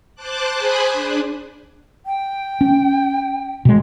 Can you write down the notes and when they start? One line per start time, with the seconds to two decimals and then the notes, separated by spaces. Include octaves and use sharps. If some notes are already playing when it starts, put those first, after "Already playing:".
0.15 C5 A5 D6 F#6
0.54 G#4 C5 G#5 B5 D#6 F#6
0.93 D4
2.06 G5
2.61 C#4
3.65 B2 G#3